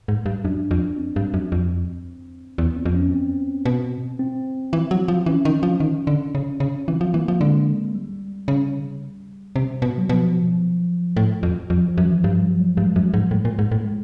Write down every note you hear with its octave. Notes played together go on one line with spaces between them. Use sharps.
G#2
G2
F#2 D4
F2
C4
G2
F#2
F2
E2 B3
C4
F2
C#4
C4
B2
C4
E3
F#3
F3
E3 C#4
D#3
F3
D#3
D3
C#3
C#3
E3 C4
F3
E3 A#3
F3
D3 G#3
G3
C#3
C3
B2
F#3
B2 F3
A2
F2
F2 F3
F3
F#2
E3
G2 F3
F#3
G3
G2 G#3
F#2
G#2
A2
A#2
G#2
A2
G#3